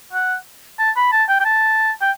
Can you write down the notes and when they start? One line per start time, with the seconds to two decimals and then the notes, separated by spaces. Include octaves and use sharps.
0.13 F#5
0.79 A5
0.96 B5
1.12 A5
1.29 G5
1.40 G5
1.45 A5
2.01 G5